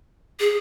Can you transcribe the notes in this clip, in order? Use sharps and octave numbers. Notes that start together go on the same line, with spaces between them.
G#4